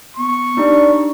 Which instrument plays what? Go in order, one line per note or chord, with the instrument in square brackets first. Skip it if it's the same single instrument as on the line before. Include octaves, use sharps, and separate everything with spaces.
[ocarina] B3 [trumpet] C#6
[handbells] D4 D#4 G4 [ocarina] D5